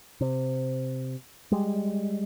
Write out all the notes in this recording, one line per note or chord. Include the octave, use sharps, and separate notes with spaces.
C3
G3 G#3